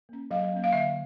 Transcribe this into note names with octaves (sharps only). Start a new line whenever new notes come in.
A#3 C#4
F#3 F5
A#3 C#4
F5
D3 E5